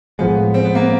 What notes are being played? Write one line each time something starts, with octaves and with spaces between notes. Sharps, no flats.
A2 F3 G#3 B3
C4
B3
A#3